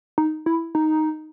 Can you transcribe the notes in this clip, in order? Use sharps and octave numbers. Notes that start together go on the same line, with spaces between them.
D#4
E4
D#4